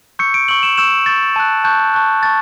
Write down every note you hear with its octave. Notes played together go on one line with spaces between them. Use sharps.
C#6 E6 G6 C#7
D7
C#6 E6 G6 F#7
E7
C#6 E6 G6 E7
C#6 E6 G6 A6
A5 C#6 F#6
A5 C#6 F#6 G6
A5 C#6 F#6
A5 C#6 A6